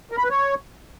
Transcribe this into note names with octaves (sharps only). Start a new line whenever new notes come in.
A#4
B5
B4
C#5